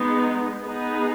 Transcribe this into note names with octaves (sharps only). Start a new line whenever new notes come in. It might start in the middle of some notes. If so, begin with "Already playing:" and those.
Already playing: G#3 B3 D#4
B3 D#4 G#4 B4